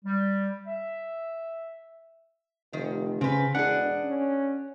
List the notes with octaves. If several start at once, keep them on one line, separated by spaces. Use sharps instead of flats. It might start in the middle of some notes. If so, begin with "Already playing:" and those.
G3
E5
F1 D#3
C#3 C4 B4
E1 D4 G#4 F#5
C#4